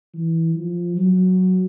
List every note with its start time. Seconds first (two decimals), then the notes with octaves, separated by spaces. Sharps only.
0.14 E3
0.55 F3
0.97 F#3